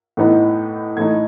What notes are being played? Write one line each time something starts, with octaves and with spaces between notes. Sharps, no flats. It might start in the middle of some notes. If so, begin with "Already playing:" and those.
A2 E3 B3 D#4
A2 E3 A3 D#4 G#6